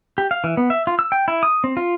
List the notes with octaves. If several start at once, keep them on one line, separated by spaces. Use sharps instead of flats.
G4
F5
E3
B3
E5
F4
E6
G5
E4
D#6
C4
F4